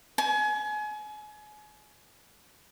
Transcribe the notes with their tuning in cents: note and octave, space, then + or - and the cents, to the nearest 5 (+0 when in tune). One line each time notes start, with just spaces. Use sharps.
G#5 +30